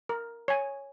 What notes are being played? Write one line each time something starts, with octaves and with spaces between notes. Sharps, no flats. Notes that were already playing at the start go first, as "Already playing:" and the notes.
A#4
C#5 G#5